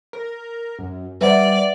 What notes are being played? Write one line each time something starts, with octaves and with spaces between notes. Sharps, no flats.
A#4
F#2
G3 B4 D5 E5 F#5